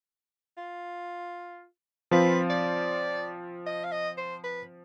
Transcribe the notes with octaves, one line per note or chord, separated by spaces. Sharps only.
F4
F3 C4 F4 B4
D5
D#5
F5
D#5
C5
B4